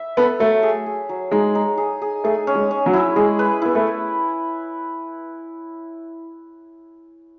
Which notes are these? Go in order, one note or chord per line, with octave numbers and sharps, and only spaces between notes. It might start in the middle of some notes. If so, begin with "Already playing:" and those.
Already playing: E5
B3 A4
F#3 A3
G#4
G#4
F#3
G#3 D#4
D#4
G#4
G#4
A3 G#4
C#4
G#3
C#4
F#3
E4
G#3 G#4
B4
B3 E4
A3